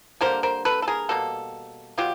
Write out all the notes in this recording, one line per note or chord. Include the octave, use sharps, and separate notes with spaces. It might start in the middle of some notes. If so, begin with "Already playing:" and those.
D3 G3 A#3 A#4 C5
A#4 C5
A4 B4
A4
G#4 A#4
B2 G3 A#3 A4
B2 F#3 F4 G4